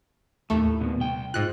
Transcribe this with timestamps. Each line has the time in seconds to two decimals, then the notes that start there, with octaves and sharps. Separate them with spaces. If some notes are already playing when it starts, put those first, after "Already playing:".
0.50 D#2 A2 A3
0.80 A#2 D#3 B3
0.99 C2 G5
1.34 G#2 F4 F#6